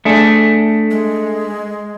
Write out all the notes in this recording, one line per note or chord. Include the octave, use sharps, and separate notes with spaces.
A3 D4 G#4
G#3